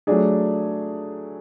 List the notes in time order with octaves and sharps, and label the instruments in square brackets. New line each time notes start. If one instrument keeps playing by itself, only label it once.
[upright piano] F#3 A3 D4 G#4